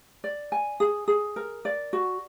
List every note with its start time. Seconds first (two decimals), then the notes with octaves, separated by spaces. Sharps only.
0.24 D5
0.52 G#5
0.80 G#4
1.08 G#4
1.36 A#4
1.65 D5
1.93 F#4